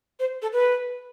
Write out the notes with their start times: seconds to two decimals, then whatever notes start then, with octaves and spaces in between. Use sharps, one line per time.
0.20 C5
0.42 A4
0.53 B4